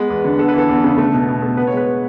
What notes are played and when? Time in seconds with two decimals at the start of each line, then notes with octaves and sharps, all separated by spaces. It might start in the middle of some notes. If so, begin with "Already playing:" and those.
Already playing: G#3 B3 B4
0.10 E2
0.24 D3
0.39 B3 A4
0.49 B4
0.54 E3 A4
0.69 E2
0.84 C#3
0.98 A3 A4
1.13 B2
1.28 B2
1.42 A3
1.57 B3 B4
1.67 C#5
1.73 G#3 B4